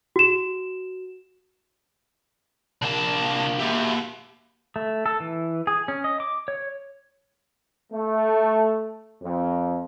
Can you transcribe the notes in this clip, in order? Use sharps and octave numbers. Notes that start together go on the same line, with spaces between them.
F#4 E7
C2 A#3 D4 A5
A#3 E4 F#4 G4
A3
A4
E3
G#4
C#4
D#5
D6
C#5
A3
F2